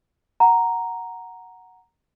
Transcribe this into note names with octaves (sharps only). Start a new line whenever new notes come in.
F#5 A#5